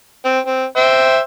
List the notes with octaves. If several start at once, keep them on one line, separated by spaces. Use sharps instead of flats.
C4
C4
C5 E5 G5